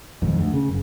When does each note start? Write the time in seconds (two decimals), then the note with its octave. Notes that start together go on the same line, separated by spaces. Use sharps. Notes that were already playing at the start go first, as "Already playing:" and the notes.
0.22 B1 F2 G#2 D#3
0.39 D2
0.53 C#3
0.69 F#1